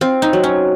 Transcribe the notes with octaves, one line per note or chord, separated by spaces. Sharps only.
C4 F4
D#4
F#3
C#4